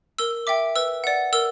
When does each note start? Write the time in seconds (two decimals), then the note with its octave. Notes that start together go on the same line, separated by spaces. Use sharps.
0.19 A#4 E6
0.47 E5 G5 D6
0.76 B4 E6
1.04 D5 F#5
1.33 A#4 E6